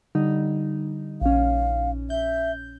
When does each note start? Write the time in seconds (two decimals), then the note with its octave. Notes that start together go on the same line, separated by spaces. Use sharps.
0.15 D3 G3 D#4
1.22 A#1 C#4 F5
2.10 E5 G6